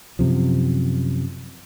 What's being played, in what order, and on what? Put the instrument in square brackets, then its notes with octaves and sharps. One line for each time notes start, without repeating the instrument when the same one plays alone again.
[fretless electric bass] F#2 C3 F3